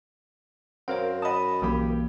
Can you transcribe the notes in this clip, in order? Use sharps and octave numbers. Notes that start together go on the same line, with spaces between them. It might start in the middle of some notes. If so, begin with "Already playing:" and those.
F#2 C4 A#4 C#5 F5 F#5
D#5 F#5 A5 B5 D#6
B1 G2 E3 A#3 G4 B5